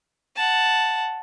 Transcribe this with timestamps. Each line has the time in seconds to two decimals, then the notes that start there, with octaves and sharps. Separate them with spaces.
0.36 F#5 A5